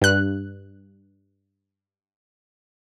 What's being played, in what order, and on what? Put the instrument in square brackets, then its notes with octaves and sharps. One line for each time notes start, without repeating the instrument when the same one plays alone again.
[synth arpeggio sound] G2 F#6